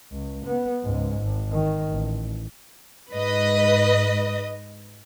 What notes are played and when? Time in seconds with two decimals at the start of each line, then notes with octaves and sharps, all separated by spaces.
0.12 C#2
0.46 B3
0.83 C#2 G#2
1.22 G#1
1.52 D#3
1.88 A1
3.13 G#2 B4 D#5